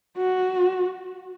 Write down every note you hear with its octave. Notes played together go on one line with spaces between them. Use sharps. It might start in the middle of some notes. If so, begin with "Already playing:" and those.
F#4